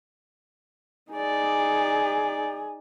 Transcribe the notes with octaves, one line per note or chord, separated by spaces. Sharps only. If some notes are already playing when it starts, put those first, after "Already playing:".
D#4 G#4 D5